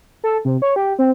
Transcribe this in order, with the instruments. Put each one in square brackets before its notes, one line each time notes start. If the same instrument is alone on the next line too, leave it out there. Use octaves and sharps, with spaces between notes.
[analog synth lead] A4
C3
C#5
G4
C4